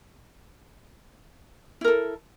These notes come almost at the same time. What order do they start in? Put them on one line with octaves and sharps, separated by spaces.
E4 A#4 A4